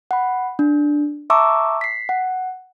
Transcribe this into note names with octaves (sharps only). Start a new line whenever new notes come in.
F#5 B5
D4
E5 A5 A#5 C#6 D6 E6
B6 C7
F#5